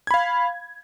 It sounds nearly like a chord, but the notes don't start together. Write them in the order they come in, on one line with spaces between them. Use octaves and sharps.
G#6 B5 F5